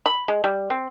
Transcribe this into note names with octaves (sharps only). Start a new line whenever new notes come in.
B5
G#3
G3
C4